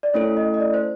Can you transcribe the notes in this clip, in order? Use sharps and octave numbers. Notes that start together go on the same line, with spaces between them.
D5
A3 C#4 E4 A4 C#5
D#5
D#5
D5
C5